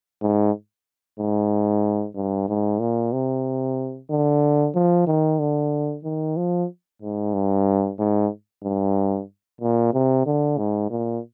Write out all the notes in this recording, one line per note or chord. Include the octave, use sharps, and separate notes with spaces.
G#2
G#2
G2
G#2
A#2
C3
D3
F3
D#3
D3
D#3
F3
G#2
G2
G#2
G2
A#2
C3
D3
G#2
A#2